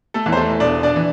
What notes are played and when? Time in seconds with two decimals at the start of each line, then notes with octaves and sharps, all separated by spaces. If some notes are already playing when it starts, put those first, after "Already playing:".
0.14 A3 A4
0.26 E2 E3
0.32 C5
0.37 A3 A4
0.60 E1 D4 D5
0.83 D4 D5
0.96 E3